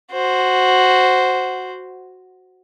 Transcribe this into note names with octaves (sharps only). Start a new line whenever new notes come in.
F#4 C5